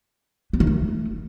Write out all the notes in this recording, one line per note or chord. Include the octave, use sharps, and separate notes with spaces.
B3
D#3
A3